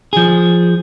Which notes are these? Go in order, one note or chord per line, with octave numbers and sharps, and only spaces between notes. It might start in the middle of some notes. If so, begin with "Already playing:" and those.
F3 G#4